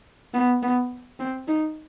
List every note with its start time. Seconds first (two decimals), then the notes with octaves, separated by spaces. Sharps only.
0.34 B3
0.63 B3
1.20 C4
1.48 D#4